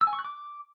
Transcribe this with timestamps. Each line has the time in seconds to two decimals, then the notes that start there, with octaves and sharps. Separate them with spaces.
0.01 E6
0.07 G#5
0.13 C#6
0.19 F#6
0.25 D6